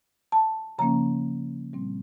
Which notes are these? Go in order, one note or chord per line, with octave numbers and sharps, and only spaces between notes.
A5
C#3 F3 A#3 C#4 A#5
A#2 G3 C4